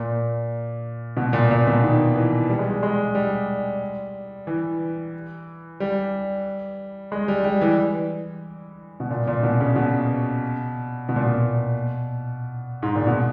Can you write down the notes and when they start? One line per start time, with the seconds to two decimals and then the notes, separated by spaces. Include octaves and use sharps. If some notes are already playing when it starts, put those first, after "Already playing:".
Already playing: A#2
1.17 B2
1.33 A#2
1.51 A#2
1.67 B2
1.84 D#3
2.16 E3
2.49 G3
2.59 G#3
2.70 G3
2.83 G#3
3.15 G3
4.47 E3
5.80 G3
7.12 G#3
7.28 G3
7.44 G3
7.61 E3
9.00 B2
9.11 A#2
9.27 A#2
9.43 B2
9.60 C#3
9.76 B2
11.09 B2
11.16 A#2
11.24 B2
12.83 G#2
12.95 A#2
13.07 B2